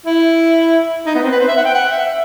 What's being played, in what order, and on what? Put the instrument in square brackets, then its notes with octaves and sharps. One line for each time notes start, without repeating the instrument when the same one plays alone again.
[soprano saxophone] E4
D#4
B3
C4
B4
C5
E5
F#5
G5
F#5
E5
E5